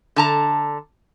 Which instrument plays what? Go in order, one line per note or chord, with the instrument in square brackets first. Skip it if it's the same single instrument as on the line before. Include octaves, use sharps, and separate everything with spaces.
[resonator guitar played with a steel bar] D3 A5 A#5